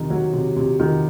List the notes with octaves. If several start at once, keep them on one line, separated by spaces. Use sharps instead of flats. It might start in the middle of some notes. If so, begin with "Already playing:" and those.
Already playing: C3 D#3
F#3
C3
C3
D#3